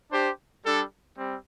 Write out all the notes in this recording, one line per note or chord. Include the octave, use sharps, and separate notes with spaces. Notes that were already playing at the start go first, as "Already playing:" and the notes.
D4 G4 C5
G3 D4 A4
G3 C4